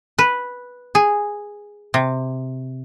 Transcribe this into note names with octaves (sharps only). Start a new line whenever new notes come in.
B4
G#4
C3